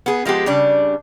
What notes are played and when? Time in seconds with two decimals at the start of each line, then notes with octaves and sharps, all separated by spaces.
0.06 B3 G#4
0.25 F3 G#3 B3 G4
0.46 C#3 G3 D4